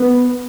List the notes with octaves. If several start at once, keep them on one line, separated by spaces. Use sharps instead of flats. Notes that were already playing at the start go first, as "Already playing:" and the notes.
Already playing: B3